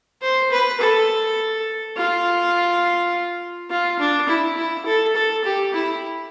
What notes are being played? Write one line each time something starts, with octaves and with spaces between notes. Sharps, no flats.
C5
B4
A4
F4
F4
D4
E4
E4
A4
A4
G4
E4